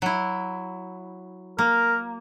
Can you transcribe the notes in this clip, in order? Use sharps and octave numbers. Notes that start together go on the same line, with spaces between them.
F#3 E4
A#3 A#4